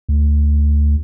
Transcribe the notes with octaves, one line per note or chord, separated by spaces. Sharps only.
D2